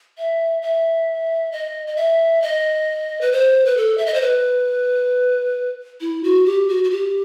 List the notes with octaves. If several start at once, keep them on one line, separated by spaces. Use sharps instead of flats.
E5
E5
D#5
D#5
E5
D#5
B4
C5
B4
A4
E5
D#5
C5
B4
E4
F#4
G4
F#4
F#4
G4